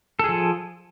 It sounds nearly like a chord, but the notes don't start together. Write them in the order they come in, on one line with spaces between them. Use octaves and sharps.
A4 G#4 F3